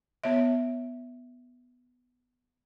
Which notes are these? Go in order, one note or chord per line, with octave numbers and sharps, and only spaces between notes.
B3 C#5 E5